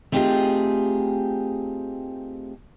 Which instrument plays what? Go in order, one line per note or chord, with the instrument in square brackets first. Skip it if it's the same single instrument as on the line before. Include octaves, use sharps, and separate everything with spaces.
[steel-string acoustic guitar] A3 C4 D#4 F4 G4 G#4